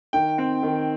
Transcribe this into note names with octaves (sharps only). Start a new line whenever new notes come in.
D#3 G5
C4
D#3